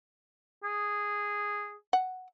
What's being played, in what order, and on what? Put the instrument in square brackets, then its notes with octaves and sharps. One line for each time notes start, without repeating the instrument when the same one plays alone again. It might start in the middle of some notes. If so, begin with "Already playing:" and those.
[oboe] G#4
[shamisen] F#5